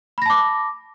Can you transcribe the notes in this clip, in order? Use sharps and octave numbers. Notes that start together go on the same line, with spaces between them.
A5 B5 D6 A#6